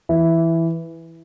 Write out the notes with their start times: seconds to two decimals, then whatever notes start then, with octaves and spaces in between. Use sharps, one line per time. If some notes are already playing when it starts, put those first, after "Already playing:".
0.09 E3 E4